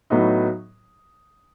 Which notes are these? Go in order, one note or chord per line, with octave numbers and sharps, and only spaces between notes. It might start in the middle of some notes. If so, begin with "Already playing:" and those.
A2 F#3 B3 D#4